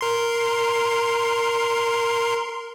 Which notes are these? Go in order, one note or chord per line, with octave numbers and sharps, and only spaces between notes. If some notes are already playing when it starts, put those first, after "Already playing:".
A#4 C6